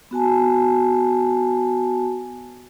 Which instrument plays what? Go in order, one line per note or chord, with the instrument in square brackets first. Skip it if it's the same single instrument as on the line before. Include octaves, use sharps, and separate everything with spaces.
[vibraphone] B3 F#4 G#5 A5